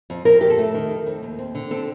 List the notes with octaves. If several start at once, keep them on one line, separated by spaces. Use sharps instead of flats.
F2
F2 A#4
F2 G4
A4
A3
D#3
F2
F2
D#2
C4
D3
C4 A4